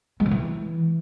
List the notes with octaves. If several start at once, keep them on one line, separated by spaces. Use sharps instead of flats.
G#3
C#3
E3